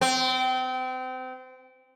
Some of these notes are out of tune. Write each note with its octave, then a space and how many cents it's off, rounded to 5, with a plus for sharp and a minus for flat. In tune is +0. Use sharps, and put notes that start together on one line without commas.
C4 -30